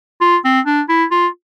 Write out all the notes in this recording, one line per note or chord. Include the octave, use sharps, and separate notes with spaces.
F4
C4
D4
E4
F4